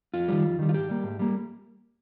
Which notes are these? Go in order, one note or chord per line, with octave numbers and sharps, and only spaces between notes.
F2 F4
D#3 G3
F2
D#3 G3
F4
G#2 G4
G3 A#3
G#2
G3 A#3